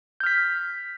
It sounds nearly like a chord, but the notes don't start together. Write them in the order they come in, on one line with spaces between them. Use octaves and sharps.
G6 F6 B6